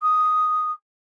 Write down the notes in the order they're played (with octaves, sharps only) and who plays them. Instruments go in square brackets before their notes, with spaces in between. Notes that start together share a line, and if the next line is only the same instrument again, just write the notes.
[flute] D#6